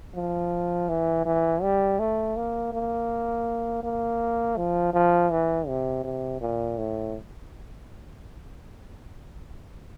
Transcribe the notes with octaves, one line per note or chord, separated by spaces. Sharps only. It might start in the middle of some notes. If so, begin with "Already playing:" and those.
F3
E3
E3
G3
A3
A#3
A#3
A#3
F3
F3
E3
C3
C3
A#2
A2